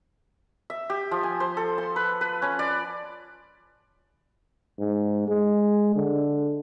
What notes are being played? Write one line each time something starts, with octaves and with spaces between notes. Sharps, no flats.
E5
G4
F3
G#5
C5
A4
C6
B4
B4
C#4
D5
G#2
G#3
D3